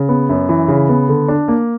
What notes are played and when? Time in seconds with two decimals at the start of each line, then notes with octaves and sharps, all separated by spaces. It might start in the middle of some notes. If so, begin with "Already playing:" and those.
Already playing: C#3
0.09 B3
0.29 F#2
0.49 E3
0.68 C#3
0.89 B3
1.09 D3
1.28 D4
1.48 A#3